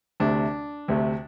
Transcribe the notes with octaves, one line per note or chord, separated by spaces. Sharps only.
D2 C3 A3 D4
D2 C3 A3